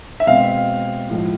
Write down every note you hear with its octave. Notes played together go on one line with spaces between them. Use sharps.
E5
B2 G#3 C4 F5
A2 F3 G#3